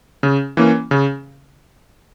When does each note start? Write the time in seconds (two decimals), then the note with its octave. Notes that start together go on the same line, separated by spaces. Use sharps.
0.23 C#3
0.57 E3 A#3 C#4
0.91 C#3